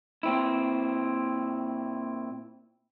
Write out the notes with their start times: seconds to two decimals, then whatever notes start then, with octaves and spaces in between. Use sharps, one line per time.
0.23 A#2 C4 E4